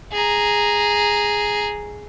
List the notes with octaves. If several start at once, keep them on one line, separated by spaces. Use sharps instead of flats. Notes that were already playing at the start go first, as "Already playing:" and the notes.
G#4 A#5